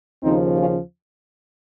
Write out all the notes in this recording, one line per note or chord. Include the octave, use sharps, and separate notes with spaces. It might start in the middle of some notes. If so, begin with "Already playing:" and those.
D#2 C#3 F3 C4 D#4
C#4 F4